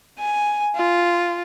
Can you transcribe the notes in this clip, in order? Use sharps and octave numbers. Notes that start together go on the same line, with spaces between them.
G#5
F4